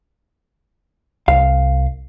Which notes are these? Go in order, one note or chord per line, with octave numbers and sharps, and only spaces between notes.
C2 F5